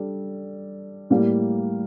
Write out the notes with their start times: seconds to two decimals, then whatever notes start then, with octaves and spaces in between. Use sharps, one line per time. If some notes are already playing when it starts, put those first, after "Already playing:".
Already playing: G3 D4 A4
1.10 A2 G3 A#3